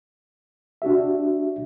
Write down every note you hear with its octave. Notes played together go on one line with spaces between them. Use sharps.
D4 F#4 G4 E5